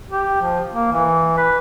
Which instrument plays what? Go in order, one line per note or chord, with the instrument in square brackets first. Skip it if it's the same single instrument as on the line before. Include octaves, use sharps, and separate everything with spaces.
[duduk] G4
F3
A#3
E3
B4